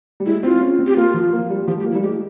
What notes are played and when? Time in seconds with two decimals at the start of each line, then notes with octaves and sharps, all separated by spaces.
0.20 G3
0.26 G#3 E4
0.43 C4 F4
0.61 C#4
0.79 C4
0.87 G4
0.97 A#3 F4
1.14 F3
1.33 A#3
1.50 G3
1.68 F3 G4
1.77 G3
1.80 G4
1.86 A#3
1.92 E4
1.95 G3
2.03 G#3 G4